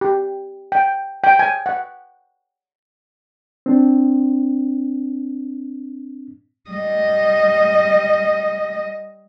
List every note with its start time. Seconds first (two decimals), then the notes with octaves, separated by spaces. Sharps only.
0.01 G4
0.72 G5
1.24 G5
1.39 G#5
1.66 F#5
3.66 C4 D4
6.70 G3 D#5